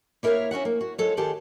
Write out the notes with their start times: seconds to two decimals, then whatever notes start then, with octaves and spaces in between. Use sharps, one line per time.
0.23 A#3 E4 A#4 C#5 E5 F5
0.51 C#4 F#4 E5 F#5
0.65 A#3
0.81 F#4
0.98 G#3 F4 A4 C#5
1.17 D#3 F4 G4 G#4 F#5 A5